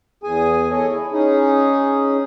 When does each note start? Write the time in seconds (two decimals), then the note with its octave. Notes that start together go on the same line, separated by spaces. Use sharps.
0.23 E2 G#4 G#5
0.71 G#4 A4 C#5 D#5 G#5
0.88 E4
1.12 C#4 D#4 G#4